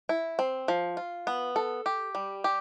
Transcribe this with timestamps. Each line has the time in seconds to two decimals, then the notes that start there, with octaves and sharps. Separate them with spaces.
0.09 E4
0.39 C4
0.68 F3
0.97 F4
1.27 B3
1.56 A4
1.86 G4
2.15 G3
2.44 G4